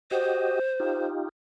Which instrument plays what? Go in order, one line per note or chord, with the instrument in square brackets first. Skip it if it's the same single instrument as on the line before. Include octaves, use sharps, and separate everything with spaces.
[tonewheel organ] F#4 G4 D#5 [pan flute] C5
[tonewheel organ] D#4 F4 G4